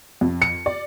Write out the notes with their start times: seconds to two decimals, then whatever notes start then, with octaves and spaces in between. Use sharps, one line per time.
0.21 F2
0.42 C#7
0.66 D5